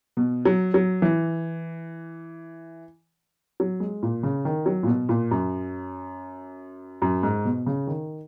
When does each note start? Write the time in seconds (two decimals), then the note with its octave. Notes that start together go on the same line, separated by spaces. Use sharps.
0.17 B2
0.45 F#3
0.74 F#3
1.02 E3
3.60 F#3
3.80 G#3
4.03 A#2
4.23 C#3
4.45 D#3
4.66 F#3
4.83 A#2
4.87 B2
5.09 A#2
5.31 F#2
7.02 F#2
7.23 G#2
7.45 B2
7.66 C#3
7.87 D#3